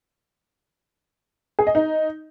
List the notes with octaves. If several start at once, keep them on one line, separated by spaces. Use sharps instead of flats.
G#4
D#5
D#4